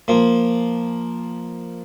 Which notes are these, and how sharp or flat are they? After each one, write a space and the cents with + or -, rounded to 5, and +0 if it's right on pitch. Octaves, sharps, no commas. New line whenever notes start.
F3 +0 A#3 +0